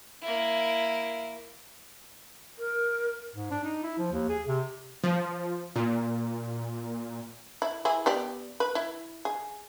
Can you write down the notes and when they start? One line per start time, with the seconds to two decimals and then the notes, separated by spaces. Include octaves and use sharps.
0.22 A#3 E4
2.59 A#4
3.35 G#2
3.51 D4
3.64 D#4
3.83 E4
3.98 F3
4.12 D#2
4.29 G#4
4.48 C3
5.04 F3
5.76 A#2
7.62 E4
7.85 E3 E4 G#4
8.06 B3 G4 D5
8.60 B4
8.75 E4
9.25 G#4